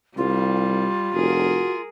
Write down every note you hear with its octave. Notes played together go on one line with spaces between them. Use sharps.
C2 G3 F4
F1 F#4 G#4 A#4